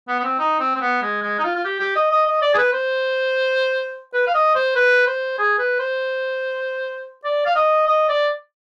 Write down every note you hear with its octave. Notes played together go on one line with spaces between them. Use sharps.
B3
B3
C4
D#4
C4
C4
B3
G#3
G#3
D#4
F4
F4
G4
G4
D#5
D#5
D#5
D5
G#4
B4
C5
B4
F5
D#5
C5
B4
C5
G#4
B4
C5
D5
F5
D#5
D#5
D5